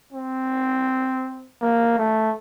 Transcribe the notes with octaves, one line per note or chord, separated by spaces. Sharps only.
C4
A#3
A3